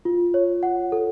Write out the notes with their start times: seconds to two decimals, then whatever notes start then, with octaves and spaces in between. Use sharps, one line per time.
0.05 F4
0.34 C#5
0.63 F#5
0.92 A4